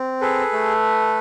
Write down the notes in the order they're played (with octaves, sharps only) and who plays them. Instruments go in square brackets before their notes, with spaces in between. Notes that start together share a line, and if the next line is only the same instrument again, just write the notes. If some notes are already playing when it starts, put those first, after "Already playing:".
Already playing: [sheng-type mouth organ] C4
G#4 A4 B4
A3